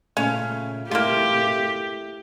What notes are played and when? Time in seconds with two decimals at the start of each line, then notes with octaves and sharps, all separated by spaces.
0.17 A#2 C#3 A3 C#4 F5
0.91 A3 A#3 E4 F4 G4